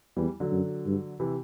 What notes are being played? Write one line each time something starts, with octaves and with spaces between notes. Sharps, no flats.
E2 E3 G3
D3 F#3
F#2
G2
C3 E3